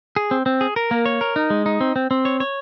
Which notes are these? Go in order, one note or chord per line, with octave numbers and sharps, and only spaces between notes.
G#4
C4
C4
G#4
A#4
A#3
C#5
A#4
D#4
G#3
D#4
C4
C4
C4
C#5
C#5